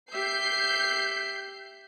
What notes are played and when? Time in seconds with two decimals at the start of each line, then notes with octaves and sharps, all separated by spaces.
0.12 G4 E5 G6 C7